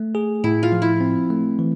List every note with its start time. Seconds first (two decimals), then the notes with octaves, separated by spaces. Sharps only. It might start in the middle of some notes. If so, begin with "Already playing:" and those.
Already playing: A3
0.15 G#4
0.44 A2 E4
0.63 F4
0.72 F3
0.82 E4
1.00 C4
1.30 A3
1.59 E3